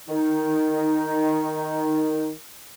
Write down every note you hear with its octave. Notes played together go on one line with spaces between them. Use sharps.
D#3 D#4